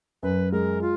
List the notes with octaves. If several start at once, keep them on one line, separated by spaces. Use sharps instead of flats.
F#2 B4
G#3 A#4
F4